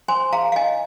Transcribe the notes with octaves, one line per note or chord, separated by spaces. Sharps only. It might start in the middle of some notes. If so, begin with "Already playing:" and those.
C5 G#5 C6
G#4 F5 A#5
F5
D#4 D#5 G#5